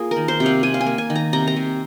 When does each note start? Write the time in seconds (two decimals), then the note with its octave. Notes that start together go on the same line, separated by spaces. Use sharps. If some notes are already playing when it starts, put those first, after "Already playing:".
Already playing: A#3 F4 G#4
0.11 A#4
0.16 D#3
0.28 C5
0.40 C3
0.46 F5
0.63 C3 G#5
0.74 F5
0.81 G#5
0.86 A#3
0.98 G#5
1.10 D#3
1.16 A#5
1.33 C3 A#5
1.47 A#5
1.56 C3